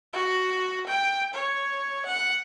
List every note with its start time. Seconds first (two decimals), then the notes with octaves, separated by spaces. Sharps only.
0.13 F#4
0.87 G5
1.34 C#5
2.06 F#5